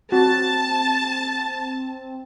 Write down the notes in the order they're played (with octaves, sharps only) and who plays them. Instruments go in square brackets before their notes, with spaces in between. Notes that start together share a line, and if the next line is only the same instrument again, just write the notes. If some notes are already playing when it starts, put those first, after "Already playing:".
[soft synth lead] C4 [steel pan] F#4 [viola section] A5